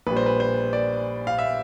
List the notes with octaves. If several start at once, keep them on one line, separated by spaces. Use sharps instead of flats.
A#1 A#2 G3 B4
C5
B4
C5
D5
F5
E5